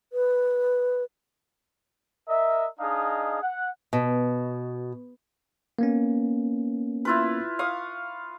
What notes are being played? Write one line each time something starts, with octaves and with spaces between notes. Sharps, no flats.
B4
A#4 D#5 E5
D4 D#4 G#4 D#5 F5
F#5
B2
A#3 B3 C#4
E4 F4 B4
F5 C#6 D#6